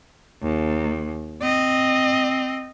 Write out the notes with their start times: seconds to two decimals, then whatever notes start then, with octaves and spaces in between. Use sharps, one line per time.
0.42 D#2
1.42 C4 D#5